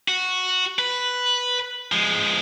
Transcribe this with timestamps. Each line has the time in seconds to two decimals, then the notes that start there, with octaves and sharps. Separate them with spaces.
0.08 F#4
0.79 B4
1.92 F3 G#3